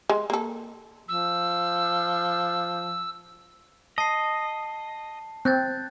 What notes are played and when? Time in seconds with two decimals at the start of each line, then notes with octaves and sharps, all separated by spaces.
0.09 G#3
0.30 A#3 A4
1.09 F3 E6
3.98 D#5 A5 C7
5.45 C4 F#6 G6 A6